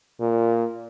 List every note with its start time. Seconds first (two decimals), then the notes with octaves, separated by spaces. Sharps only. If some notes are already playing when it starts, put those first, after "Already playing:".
0.20 A#2